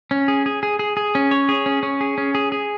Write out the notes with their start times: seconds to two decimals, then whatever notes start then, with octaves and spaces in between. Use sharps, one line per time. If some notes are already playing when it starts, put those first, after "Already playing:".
0.11 C#4
0.28 G#4
0.46 G#4
0.63 G#4
0.79 G#4
0.97 G#4
1.15 C#4
1.31 C#5
1.49 G#4
1.66 C#4
1.83 C#4
2.01 G#4
2.18 C#4
2.35 G#4
2.52 G#4